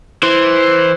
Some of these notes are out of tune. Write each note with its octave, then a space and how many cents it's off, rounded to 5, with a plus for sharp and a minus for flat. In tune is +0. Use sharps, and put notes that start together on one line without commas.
E3 +0 C5 +0